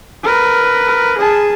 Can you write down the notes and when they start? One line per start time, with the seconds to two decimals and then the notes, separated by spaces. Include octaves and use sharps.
0.24 A#4 B4
1.18 G#4 A5